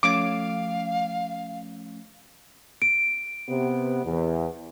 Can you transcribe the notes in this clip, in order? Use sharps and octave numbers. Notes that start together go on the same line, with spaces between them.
F3 A3 C#4 F5 D6
D7
C3 B3
E2